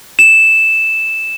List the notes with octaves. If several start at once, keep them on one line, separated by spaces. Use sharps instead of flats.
E7